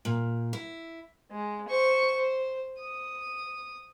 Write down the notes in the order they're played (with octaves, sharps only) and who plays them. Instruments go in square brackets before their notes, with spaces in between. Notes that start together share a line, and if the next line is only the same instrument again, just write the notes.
[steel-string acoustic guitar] A#2
E4
[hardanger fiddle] G#3
C5 C#6
C5
D#6